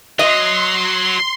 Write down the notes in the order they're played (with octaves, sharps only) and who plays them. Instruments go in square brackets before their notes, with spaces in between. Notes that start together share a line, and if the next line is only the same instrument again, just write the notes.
[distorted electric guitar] F#3 [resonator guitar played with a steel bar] D#5 [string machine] C6